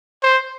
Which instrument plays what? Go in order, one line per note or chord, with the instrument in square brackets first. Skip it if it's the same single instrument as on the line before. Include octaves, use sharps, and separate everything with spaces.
[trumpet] C5